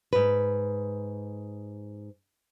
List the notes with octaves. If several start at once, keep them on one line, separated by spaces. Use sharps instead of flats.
G#2 B4